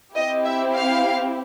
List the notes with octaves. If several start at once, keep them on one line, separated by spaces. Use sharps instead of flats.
C4 E4 G4 D#5
E5
F5